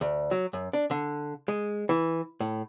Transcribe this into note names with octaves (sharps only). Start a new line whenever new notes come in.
D2
F#3
F#2
D4
D3
G#3
E3
A2